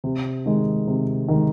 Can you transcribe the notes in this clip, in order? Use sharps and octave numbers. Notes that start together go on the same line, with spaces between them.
C3
D#3 G#3
C3
D#3 G#3